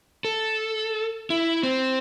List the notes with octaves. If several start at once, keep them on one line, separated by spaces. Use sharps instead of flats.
A4
E4
C4